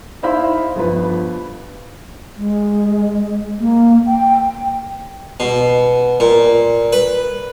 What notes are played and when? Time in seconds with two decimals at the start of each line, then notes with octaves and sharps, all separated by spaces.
0.23 D#4 E4 C5 E5 F5 B5
0.76 G1 F3 B4 B5
2.37 G#3
3.60 A#3
4.06 G5
5.40 B2
6.20 A#2
6.93 B4